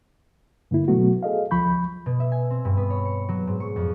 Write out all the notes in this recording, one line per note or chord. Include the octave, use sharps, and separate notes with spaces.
G2 D3 A#3 E4
B2 F#3 A3 B3 F#4
G#4 A4 D#5 F5
C#2 F3 B5 C#6 G6
B2
E5
G#5
C4
G2
B3
C#5
C#7
F#3
G#2
C#6
F2